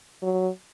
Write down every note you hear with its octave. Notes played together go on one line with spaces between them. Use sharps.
F#3